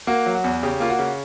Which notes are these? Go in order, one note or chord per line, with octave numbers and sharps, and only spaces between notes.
A#3 F#4
F#3
F#4
E2
C#3 G4
A#3 F4
F#4
C#3